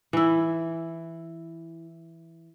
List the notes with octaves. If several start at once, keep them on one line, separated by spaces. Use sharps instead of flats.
E3 E4